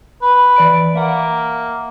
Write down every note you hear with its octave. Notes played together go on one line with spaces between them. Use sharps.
B4
E3 D5 D7
A#3 E5 F#5